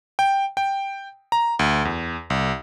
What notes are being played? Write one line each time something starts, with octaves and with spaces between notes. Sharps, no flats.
G5
G5
A#5
D2
E2
C2